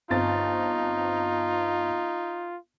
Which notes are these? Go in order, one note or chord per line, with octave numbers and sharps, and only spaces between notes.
G1 C4 D#4 F4 A6